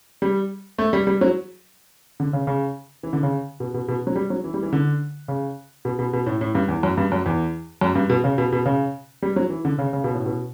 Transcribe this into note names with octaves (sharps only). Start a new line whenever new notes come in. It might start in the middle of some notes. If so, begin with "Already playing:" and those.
G3
A3
G3
G3
F#3
D3
C#3
C#3
E3
D3
C#3
B2
B2
B2
F#3
G3
F#3
E3
G3
E3
D3
C#3
B2
B2
B2
A2
A2
G2
E2
F#2
G2
F#2
E2
F#2
G2
B2
C#3
B2
B2
C#3
G3
F#3
E3
D3
C#3
C#3
B2
A2
B2